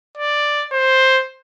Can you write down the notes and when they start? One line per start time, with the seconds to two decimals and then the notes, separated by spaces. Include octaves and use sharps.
0.17 D5
0.72 C5